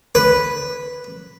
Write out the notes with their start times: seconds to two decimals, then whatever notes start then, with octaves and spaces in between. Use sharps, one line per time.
0.15 B4